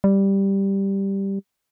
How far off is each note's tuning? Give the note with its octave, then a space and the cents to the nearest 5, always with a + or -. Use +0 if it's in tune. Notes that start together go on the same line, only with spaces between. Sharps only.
G3 +0